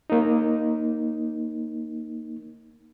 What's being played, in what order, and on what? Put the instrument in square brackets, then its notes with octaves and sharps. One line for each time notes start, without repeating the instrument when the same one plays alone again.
[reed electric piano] A#3 D#4